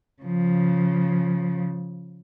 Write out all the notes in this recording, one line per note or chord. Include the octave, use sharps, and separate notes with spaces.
C#3 F3